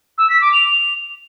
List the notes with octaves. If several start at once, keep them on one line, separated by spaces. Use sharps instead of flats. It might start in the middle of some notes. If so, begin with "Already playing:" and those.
E6
B6
D6
F7